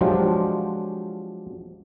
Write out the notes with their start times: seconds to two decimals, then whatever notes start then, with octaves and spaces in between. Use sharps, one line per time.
0.01 F3 F#3 G#3 D4 F4 G4